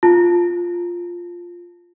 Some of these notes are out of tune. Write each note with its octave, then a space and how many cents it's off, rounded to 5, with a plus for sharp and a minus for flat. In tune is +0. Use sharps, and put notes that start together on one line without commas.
F4 +0 A5 +0